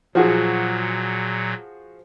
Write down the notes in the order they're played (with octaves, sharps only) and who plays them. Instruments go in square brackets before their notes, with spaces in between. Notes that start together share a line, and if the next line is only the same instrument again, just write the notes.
[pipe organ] A#2 F#3 [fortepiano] F3 F#4 G#4